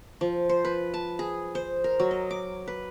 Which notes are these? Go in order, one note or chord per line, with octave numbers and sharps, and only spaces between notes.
F3
C5
B4
A5
G#4
C5
A#4
F#3
D#5
D6
B4